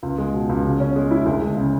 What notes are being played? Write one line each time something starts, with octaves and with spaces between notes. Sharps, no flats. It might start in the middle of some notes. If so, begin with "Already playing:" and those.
C#2
G#3
B2
C#2
C#3
C#4
G#3
E4
D2
G#3
C#3